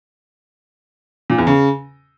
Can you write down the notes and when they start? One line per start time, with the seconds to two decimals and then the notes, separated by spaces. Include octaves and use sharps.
1.30 A#2
1.38 E2
1.47 C#3